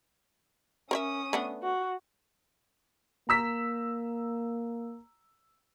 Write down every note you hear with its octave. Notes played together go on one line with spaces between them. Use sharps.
C#4 A#4 C5 E5 D#6
A3 B3 D4
F#4
A#3 A#5 E6 B6